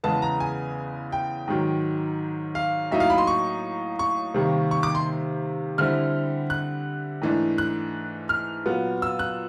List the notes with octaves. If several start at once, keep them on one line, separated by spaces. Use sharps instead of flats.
E2 C#3 E3 G#3 B3 A5
A#5
G#5
G5
G#2 D#3 F#3
F5
A2 F#3 A#3 D#4 E5
F5
B5
C6
C#6
C#6
C3 D#3 G3 A#3
C#6
D6
C6
D3 G3 C4 E4 F6
F#6
G#2 E3 A3 D4
F#6
F6
A#2 F#3 B3
E6
F#6